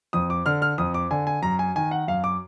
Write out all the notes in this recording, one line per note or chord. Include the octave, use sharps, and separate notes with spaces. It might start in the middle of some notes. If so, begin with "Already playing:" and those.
F2 D#6
D6
D3 F6
F6
F2 D#6
D6
D3 G#5
G#5
F#2 A#5
G#5
D#3 G#5
F#5
F#2 F5
D6